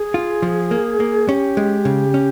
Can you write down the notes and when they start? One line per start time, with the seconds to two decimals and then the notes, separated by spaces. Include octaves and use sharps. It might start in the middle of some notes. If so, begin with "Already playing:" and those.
Already playing: G#4
0.14 F4
0.42 F3
0.71 A#3
1.00 A#3
1.28 C#4 G4
1.57 G#3
1.85 C#3
2.14 C#4